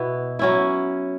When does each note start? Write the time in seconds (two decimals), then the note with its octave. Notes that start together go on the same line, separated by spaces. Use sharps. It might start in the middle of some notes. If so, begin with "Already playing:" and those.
Already playing: B2 B3 E4
0.39 F#3 C#4 E4